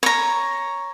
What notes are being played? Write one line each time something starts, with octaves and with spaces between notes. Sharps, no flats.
C#5 A#5